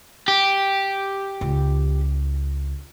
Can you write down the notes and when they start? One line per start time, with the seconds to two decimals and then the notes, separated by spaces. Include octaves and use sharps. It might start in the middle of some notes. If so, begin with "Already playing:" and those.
0.28 G4
1.41 C#2